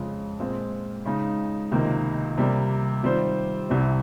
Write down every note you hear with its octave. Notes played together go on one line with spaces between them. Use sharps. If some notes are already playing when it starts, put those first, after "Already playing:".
Already playing: F2 C#3 G#3
A#2 G#3 C4 F4
C#3 G#3 D#4
C#2 C3 D#3 A#3
C3 G3 A#3
D#3 G3 C4 F4 C5
C2 C3 G3 C4